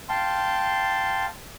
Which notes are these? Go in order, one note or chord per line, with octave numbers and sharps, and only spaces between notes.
F5 G5 A5 C6